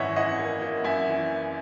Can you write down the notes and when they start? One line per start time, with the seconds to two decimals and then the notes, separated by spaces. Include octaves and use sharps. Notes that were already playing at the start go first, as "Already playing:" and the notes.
Already playing: G#1 F#2 E3 C#5 D#5 E5 F#5
0.16 E3 D#5 F#5
0.39 A#3
0.62 A#3
0.84 F#2 E5 G#5
1.08 E3